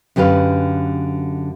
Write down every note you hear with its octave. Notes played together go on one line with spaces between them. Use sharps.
F#2 D3 G4 B4 F5